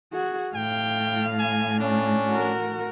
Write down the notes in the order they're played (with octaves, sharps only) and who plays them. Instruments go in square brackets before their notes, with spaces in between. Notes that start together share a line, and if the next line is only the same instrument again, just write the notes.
[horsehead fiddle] F#4 G#4
[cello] A2 [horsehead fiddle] F5 [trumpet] G5
[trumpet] G#5
[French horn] C#4 [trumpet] D4
[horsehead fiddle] F#4 A#4